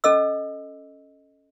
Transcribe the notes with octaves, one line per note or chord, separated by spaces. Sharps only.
C#4 A4 D#5 E6